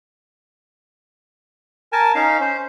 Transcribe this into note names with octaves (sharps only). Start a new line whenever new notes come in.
A#4 G#5 A5
C#4 D#4 F5
C#4 C5